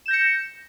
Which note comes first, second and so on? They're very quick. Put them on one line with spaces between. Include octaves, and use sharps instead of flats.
E7 G6 A#6 C#7